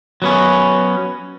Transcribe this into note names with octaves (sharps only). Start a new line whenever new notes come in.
F#3 B3 C#4